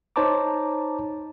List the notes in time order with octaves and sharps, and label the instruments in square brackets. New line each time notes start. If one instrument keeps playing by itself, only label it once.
[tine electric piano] D#4 C5 C#5 A5 A#5 D6